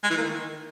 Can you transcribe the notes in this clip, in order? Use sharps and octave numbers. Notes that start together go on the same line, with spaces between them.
G#3
E3
A#3
D#3